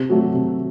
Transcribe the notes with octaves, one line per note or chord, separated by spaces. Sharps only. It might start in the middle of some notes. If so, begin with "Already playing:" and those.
Already playing: C3
F#3 A3
C3